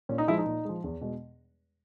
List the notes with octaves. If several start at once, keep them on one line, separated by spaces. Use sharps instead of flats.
A#2 C#4
D#4
F3 G#3 E4
D#4
A#2
F3 G#3
E2
B2 G#3